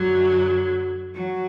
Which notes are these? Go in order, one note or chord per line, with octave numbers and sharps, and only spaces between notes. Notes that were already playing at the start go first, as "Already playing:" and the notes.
Already playing: F#2 D3 F#3
F#3